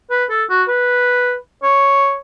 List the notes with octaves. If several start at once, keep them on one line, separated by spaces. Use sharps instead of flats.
B4
A4
F#4
B4
C#5